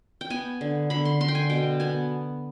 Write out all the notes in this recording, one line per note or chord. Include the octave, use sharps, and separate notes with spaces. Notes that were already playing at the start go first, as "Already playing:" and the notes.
G5
B3 G#5
D3
D3 B5
C6
D3 C6
G5
G#5
B2 G5
B3 G#5